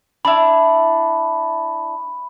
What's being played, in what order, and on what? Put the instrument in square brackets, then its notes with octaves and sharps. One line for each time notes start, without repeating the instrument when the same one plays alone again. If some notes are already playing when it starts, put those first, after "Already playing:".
[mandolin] D4 E4 [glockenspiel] B5